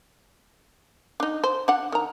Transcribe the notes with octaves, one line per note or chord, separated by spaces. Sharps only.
D4 D#4
C5
D4 F#5
D#3 A#5